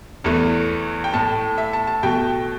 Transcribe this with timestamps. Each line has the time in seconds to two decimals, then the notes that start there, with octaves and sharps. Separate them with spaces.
0.24 E2 E3 A3
1.04 G5
1.13 A2 A3 A5
1.58 E5
1.73 A5
1.87 A5
2.03 B2 A3 G5